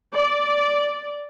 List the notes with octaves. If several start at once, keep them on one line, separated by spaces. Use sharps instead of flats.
D5